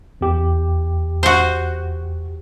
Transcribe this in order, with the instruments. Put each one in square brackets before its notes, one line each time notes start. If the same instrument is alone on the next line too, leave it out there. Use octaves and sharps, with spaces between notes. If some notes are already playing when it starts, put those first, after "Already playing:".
[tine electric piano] E2 G4
[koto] F#4 C5